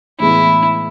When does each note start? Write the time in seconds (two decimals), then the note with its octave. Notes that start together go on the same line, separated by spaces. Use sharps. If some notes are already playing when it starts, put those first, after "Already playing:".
0.19 A2 E3 G#3 B3 E4